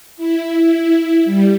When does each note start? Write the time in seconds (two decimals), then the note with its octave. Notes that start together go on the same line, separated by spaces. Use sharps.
0.17 E4
1.25 G3